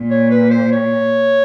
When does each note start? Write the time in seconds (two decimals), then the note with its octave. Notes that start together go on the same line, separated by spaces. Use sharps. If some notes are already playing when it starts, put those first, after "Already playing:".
Already playing: A#2
0.10 C#5
0.31 B4
0.51 C5
0.72 C#5